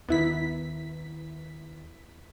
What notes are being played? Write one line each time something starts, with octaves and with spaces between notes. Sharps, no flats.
D#2 D#3 B3 E4 B6